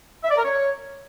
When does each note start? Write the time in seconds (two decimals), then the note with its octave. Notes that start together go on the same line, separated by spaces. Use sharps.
0.24 E5
0.31 D5
0.38 A#4
0.45 C#5